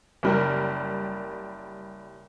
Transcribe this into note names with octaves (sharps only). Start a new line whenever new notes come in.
F#1 G3 A#4